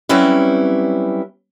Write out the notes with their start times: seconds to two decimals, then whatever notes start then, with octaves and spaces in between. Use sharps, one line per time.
0.09 F#3 G3 C4 C#4 E4 B4